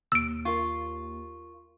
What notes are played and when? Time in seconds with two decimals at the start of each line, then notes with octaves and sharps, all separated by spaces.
0.12 D#2 E6 D7
0.45 F4 A#4 C#6